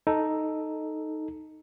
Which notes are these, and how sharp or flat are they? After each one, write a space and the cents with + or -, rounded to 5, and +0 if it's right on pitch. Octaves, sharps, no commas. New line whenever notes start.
D#4 +0 A4 +0